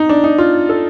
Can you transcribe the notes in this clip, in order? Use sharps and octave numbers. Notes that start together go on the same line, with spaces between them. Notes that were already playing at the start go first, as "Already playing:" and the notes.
Already playing: D#4
D4
D#4
F4
A4